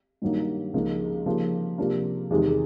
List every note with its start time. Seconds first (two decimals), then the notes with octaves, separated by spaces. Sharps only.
0.22 G2 D#3 F#3 A#3 D#4
0.74 C#2 C#3 F3 A#3 D#4
1.26 C#3 F3 A#3 D#4 G4
1.78 C3 F3 A#3 D4 F4
2.30 E2 C3 D#3 G#3